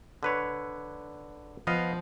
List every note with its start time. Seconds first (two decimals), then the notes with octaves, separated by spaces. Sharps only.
0.23 D3 B4 C#5
1.67 F3 B3 D#5 F5